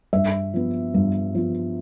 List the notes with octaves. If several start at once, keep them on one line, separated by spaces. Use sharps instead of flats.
G2 E5
F3 B3
G2
F3 B3